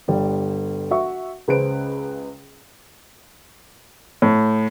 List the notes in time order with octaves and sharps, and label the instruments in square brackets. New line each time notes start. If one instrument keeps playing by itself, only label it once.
[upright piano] G1 G3
F#4 E5 C#6
C#2 C#3 B4 C5 D7
[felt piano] A2